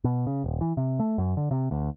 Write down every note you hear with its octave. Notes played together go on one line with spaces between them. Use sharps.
B2
C#3
D#1
E3
C3
A3
F#2
D3
C3
D2